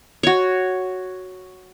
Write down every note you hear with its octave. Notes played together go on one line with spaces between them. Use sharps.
F#4 C#5